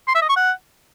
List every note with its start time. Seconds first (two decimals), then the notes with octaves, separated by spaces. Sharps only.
0.08 C6
0.15 E5
0.22 D#5
0.29 C#6
0.36 F#5